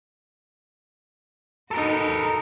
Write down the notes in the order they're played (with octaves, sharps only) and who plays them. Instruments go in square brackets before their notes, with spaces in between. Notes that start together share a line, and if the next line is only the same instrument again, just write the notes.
[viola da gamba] D#4 F#4 [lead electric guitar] A4 A#4